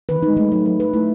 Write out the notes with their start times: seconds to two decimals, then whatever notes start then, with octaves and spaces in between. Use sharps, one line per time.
0.09 D#3 B4
0.18 E3
0.23 G#3 D#4
0.37 G#3 A3
0.51 F#3 D#4
0.65 F#3 B4
0.80 B4
0.94 A3 E4